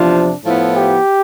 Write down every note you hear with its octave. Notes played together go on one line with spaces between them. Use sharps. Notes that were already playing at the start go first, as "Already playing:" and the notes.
Already playing: E2 C3 F3 D4
A2 F3 B3 E4
G4